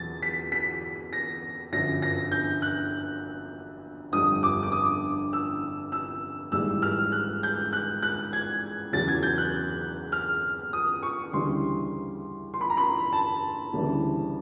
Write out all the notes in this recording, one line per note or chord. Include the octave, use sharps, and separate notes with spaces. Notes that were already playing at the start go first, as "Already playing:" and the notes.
Already playing: E2 B2 F#3 A6
B6
B6
A#6
G1 F#2 D3 F3 A#6
A#6
G6
F#6
G1 F2 D3 G3 D#6
D6
D6
D#6
E6
E6
G#1 G#2 E3 G3 E6
F6
F#6
G6
F#6
F#6
G#6
E2 C#3 F#3 A6
G#6
G6
F#6
F6
D#6
C#6
D2 C#3 E3 G3 C6
C6
B5
A#5
B5
A5
D2 C#3 E3 G3